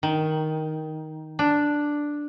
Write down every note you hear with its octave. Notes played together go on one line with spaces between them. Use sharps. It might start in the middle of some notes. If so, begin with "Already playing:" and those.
D#3
D4